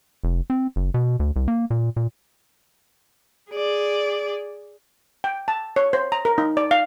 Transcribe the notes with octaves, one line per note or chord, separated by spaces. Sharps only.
F1
C4
F#1
B2
D2
C2
A#3
A#2
A#2
G#4 D5
G5
A5
C#5
C5
A#5
A#4
D#4
D5
F5